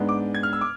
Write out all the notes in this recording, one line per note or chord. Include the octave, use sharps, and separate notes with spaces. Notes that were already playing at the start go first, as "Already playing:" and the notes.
Already playing: G#2 G#3 B3 D4
D6
G#6
F6
E6
D6